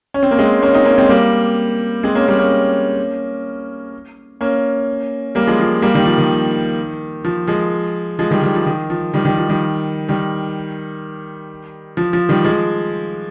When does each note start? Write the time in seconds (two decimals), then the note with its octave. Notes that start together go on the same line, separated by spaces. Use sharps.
0.14 C#4
0.23 C4
0.31 A#3
0.39 G#3 C4
0.62 A#3 C#4
0.74 C4 D#4
0.85 A#3 C#4
0.98 G#3 C4
1.09 G3 A#3
2.03 G#3 C4
2.15 A#3 C#4
2.28 G3 A#3
2.39 A#3 C#4
4.41 A#3 C#4
5.35 G3 A#3
5.47 F3 G#3
5.59 F3
5.82 G3 A#3
5.95 D#3 G3
6.06 F3
6.18 D#3
7.25 F3
7.47 F3 G#3
8.19 F3 G#3
8.31 D#3 G3
8.42 D#3 G3
8.55 F3
8.66 D#3
8.90 F3
9.14 D#3 G3
9.25 D#3 G3
9.38 F3
9.49 D#3 G3
10.09 D#3 G3
11.97 F3
12.13 F3
12.29 D#3 G3
12.44 F3 G#3